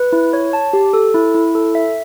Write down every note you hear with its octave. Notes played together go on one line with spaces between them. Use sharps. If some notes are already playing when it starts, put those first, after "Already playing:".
Already playing: B4
E4
C#5
A5
G4
A4
E4
E4
A4
E5